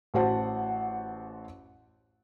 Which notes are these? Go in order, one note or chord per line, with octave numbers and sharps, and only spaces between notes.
A1 F#4 C5 F#5 A5